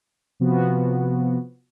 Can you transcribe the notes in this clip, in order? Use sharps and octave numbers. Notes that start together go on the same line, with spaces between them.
C3 F3 B3 F#4